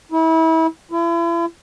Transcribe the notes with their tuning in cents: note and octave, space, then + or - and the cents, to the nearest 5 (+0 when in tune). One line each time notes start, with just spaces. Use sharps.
E4 -30
E4 +40